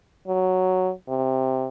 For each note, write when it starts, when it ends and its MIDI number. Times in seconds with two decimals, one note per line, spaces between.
0.27 0.91 54
1.08 1.68 48